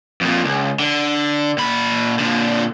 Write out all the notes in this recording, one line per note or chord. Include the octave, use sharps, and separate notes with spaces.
F2 A#2
C#2
D3
A#2 B5
A#2 D3